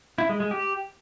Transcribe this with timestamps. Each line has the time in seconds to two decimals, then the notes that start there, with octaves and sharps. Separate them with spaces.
0.18 E4
0.29 G#3
0.40 G#3
0.51 G4